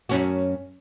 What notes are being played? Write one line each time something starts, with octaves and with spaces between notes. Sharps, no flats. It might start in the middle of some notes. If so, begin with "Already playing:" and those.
F#2 C#4 F#4